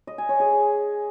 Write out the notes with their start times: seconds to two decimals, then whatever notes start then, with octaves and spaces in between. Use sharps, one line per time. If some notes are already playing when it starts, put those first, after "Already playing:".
0.07 D#5
0.18 G#5
0.29 C#5
0.40 G#4